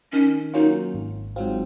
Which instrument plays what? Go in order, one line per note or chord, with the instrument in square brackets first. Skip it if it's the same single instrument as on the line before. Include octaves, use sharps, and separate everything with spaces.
[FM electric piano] D#3 [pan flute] C#4
[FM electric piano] F#3 A#3 C#4 F4 [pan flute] D#4
[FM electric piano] G#1
G#2 F#3 C4 F4